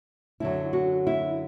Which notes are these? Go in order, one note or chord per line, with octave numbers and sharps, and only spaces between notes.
F#2 D3 F#3 E4
F#4
E4